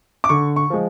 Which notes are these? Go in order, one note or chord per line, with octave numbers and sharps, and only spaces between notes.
D6
D3 C#6
C#6
F3 G#3